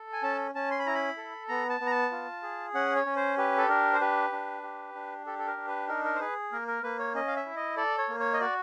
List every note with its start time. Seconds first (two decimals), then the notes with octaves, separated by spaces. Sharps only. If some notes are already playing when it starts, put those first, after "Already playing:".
Already playing: A4
0.13 G#5
0.23 C#4 A5
0.55 C#4 A5
0.71 C6
0.79 B5
0.86 E4 A#5
0.95 B5
1.17 A4
1.48 B3 A#5
1.69 A5
1.81 B3
1.86 A#5
1.91 A5
2.11 F4
2.43 G#4
2.74 C#4 F#5
2.96 C#5
3.06 C#4
3.16 C5
3.38 G4 B4
3.58 A4
3.69 D4 A#4
3.93 C5
4.01 G4 B4
4.32 D4
4.63 G4
4.95 D4
5.26 G4 A4
5.39 A4
5.47 A#4
5.57 D4
5.68 B4
5.88 D#4 A#4
6.04 A#4
6.15 C5
6.20 G#4 B4
6.52 A#3 A#4
6.68 A#4
6.83 A#3 B4
6.99 C#5
7.15 C#4 D#5
7.27 F5
7.36 E5
7.46 E4
7.56 D#5
7.77 A4 D5
7.98 C#5
8.09 A#3
8.20 C#5
8.33 D#5
8.40 F#4 D5